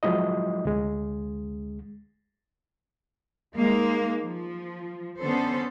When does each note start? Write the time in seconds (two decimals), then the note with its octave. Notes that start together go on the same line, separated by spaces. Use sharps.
0.03 F3 F#3 G#3 E4 D#5
0.65 D2 G#3
3.55 G#3 A#3 D#4
4.22 F3
5.20 D3 B3 C#4 A4 C5